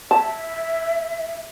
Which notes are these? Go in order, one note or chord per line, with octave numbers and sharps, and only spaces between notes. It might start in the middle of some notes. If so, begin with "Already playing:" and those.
E5 A5